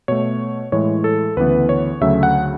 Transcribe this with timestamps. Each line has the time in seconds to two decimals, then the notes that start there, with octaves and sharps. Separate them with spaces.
0.08 B2 A3 C#5
0.72 A2 E3 G#3 C#5
1.04 A4
1.37 D2 C#3 E3 B3 B4
1.69 C#5
2.01 D2 C#3 F#3 A3 E5
2.23 F#5